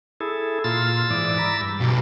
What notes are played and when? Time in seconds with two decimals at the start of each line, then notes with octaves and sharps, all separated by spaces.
0.21 E4 G#4 A4
0.64 A#2 F4 C6 E6 A6
1.10 G#2 E3 D5
1.38 A#5 B5 D6
1.61 G2
1.81 B1